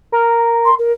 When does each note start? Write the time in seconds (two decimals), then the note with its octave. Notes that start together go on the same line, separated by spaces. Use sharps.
0.12 A#4
0.65 C6
0.78 A#4